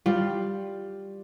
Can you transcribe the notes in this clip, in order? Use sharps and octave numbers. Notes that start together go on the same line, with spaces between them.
G3 F4